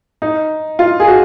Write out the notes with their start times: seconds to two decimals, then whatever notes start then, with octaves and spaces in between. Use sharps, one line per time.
0.22 D#4
0.79 F4
1.00 G#4
1.07 F#4